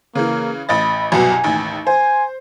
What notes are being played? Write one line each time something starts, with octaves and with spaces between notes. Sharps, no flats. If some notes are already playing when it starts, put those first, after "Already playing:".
C#3 E3 A#3
A1 D#5 B5 A6
C2 F#2 B2 G#5
A1 D#2
C5 G#5